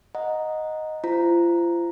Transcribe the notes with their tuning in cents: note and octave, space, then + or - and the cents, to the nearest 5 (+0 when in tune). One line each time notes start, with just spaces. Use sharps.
D#5 +0 F#5 -15 A#5 +0
F4 -35 C5 -15 A#5 +0